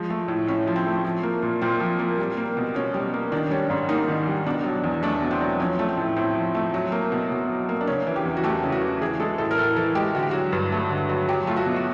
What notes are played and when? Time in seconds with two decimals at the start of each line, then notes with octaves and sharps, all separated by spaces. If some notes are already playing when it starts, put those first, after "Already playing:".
Already playing: F3 G#3
0.10 A3
0.28 A2
0.47 A2 C#4
0.67 F3
0.76 C4
0.86 A3
1.04 F3
1.23 A#3
1.43 A#2
1.61 A#2 C4
1.80 F3
1.99 A#3
2.18 G3
2.37 A#3
2.57 B2
2.75 B2 C#4
2.94 G3
3.14 A#3
3.32 D#3 D4
3.51 G3 C#4
3.70 G#2 C#4
3.89 A#3 D#4
4.08 D#3
4.27 G3
4.46 B2 D4
4.64 F#3
4.84 E2
5.03 A3 D4
5.22 B2
5.31 C4
5.41 F#3
5.60 F3 C#4
5.79 A3
5.89 C4
5.97 A2
6.17 A2 C4
6.35 F3
6.54 A3
6.74 F#3
6.92 A#3
7.12 B2
7.31 B2
7.49 F#3
7.69 A#3
7.81 D4
7.87 C#3 C#4
8.07 E3
8.16 G4
8.25 E2
8.37 F#4
8.43 A3 G4
8.63 C#3
8.72 F#4
8.82 E3
9.02 E3 G#4
9.20 G#3 A4
9.38 A2 A4
9.51 A#4
9.58 A2 A4
9.76 E3 A4
9.95 G#3 G4
10.14 D3 F#4
10.22 G4
10.31 F#3 F#4
10.52 G2
10.72 A3
10.90 D3
11.09 F#3
11.29 F#3 G4
11.47 A3 F4
11.56 F#4
11.66 B2
11.76 F#4